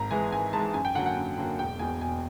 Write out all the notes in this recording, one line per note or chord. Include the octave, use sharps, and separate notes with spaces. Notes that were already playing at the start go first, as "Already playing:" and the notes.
Already playing: G#1 A#5
G#2 E3 G#3 G#5
G#1 G#5
G#2 E3 G#3 A5
F#2 G#5
G5
D3 F#3 A#3 F#5
F#5
F#2
D3 F#3 A#3
E1 G5
E2 B2 G#5
E1 G#5